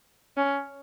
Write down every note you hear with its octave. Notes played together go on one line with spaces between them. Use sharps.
C#4